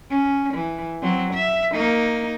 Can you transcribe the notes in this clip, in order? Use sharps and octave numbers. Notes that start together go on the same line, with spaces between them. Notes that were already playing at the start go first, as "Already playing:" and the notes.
C#4
E3
F#3 C4
E5
A#3 D#4